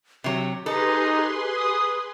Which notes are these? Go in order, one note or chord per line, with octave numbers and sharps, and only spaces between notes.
C3 F#3 G4
D#4 G#4 A4 B4 C6
D#6